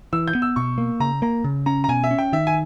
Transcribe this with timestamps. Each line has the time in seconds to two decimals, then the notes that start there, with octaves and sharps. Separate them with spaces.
0.13 E3 E6
0.28 G6
0.35 B3
0.42 E6
0.56 B2 C#6
0.78 A#3
1.00 C#3 A#5
1.22 A#3 A#5
1.44 C#3
1.66 C#4 A#5
1.84 A#5
1.89 B2 G#5
2.04 E5
2.11 C#4
2.18 G5
2.33 D#3 E5
2.47 G#5